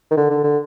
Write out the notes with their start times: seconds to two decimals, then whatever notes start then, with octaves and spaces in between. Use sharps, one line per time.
0.11 D#3
0.17 D3
0.30 D3
0.44 D3